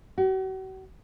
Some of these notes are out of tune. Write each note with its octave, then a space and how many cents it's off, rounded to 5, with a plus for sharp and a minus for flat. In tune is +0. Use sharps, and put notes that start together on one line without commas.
F#4 +40